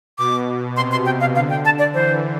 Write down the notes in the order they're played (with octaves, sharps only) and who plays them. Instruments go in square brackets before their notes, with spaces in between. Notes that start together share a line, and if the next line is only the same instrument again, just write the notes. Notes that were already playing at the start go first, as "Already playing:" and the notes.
[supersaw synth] B2 [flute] D6
[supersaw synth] C3 [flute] C6
[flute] C6
G5
F5
[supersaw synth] D3 [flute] F5
[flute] G5
A5
D5
[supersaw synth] E3 [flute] C5